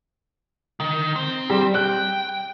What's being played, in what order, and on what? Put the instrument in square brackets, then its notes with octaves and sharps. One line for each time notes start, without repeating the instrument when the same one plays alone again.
[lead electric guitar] D#3
C4
[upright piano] G3
[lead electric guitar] G5 [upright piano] F#6